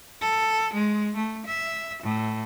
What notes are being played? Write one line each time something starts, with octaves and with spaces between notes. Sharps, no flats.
A4
G#3
A3
E5
A2